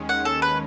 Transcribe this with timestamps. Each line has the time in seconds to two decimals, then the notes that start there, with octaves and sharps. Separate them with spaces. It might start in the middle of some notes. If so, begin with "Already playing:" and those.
Already playing: D#2 D#3 G#3 C#4
0.09 F#5
0.25 A4
0.42 B4